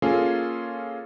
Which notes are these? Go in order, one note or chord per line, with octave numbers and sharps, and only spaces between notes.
A#3 C#4 F4 G#4 A4